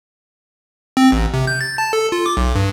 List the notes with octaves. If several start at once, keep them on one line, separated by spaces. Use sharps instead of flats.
C4
A1
C3
G6
A6
A5
A4
F4
D6
B1
G2